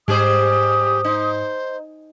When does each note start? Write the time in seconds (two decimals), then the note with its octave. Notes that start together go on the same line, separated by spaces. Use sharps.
0.08 G#2 G3 G4 G#4 C5 D#6
1.04 D#4 C5